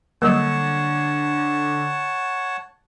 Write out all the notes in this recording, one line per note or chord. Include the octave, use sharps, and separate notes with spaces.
D3 F#3 G3 A#3 C#5 F#5 A5